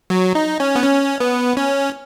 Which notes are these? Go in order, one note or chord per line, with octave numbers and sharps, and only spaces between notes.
F#3
D#4
C#4
B3
C#4
B3
C#4